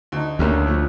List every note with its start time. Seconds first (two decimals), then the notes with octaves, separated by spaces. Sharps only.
0.12 D2 D#4
0.39 D2 A#3 C#4 G4
0.66 D3 F3 A3